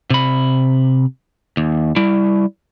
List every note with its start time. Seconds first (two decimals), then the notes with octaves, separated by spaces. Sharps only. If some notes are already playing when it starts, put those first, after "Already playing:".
0.10 C3 B5
1.57 D#2
1.96 G3 E4